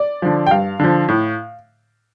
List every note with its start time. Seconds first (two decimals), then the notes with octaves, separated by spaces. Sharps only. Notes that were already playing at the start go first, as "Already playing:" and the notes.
Already playing: D5
0.22 D3 F3
0.46 G5
0.51 G2 F5
0.80 D3 F3
1.09 A2